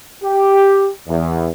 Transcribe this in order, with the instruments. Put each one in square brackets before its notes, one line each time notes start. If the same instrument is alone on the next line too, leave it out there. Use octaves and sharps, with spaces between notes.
[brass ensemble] G4
E2